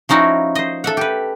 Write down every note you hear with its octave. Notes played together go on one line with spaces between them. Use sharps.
F3 C#4 D#4 E4 F#4
C5 D#5
A4 E5 F#5
G4 B4